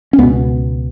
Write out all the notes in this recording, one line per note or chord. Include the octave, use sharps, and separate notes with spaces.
C#4
C#2 B2 B3